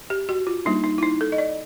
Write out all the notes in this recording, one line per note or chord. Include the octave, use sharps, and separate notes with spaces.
G4
F#4
F4
G3 A#3 D4 D#4
D#4
E4
D#4
A4
D#5
D5